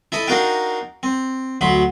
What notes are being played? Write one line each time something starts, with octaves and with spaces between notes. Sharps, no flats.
E4 A4 D#5
D4 D#4 F#4 A#4 F5 G5
C4
D2 F#3 B5 C6